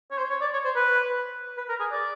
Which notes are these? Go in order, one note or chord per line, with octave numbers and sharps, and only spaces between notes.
C#5
C5
C#5
D5
C#5
C5
B4
B4
A#4
G#4
D5